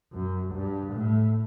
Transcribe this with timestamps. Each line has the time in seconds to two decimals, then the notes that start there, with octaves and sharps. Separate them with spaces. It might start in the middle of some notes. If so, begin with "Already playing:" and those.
0.13 F#2
0.54 G2
0.92 A2